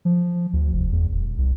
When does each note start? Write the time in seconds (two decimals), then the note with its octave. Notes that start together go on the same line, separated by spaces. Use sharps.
0.05 F3
0.53 D2
0.73 F1
0.92 E2
1.13 D#1
1.38 C2